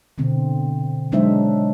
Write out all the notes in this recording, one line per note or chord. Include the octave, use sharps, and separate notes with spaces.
B2 D3 C4
F#3 G#3 D4 D#4 C5 E5